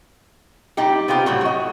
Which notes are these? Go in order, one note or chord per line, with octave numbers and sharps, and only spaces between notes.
A#2 G3 D#4 G4
B3 C4 F4 G4
A2 F#3 G3
F#4 D#5